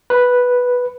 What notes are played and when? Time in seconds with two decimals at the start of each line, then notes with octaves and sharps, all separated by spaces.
0.10 B4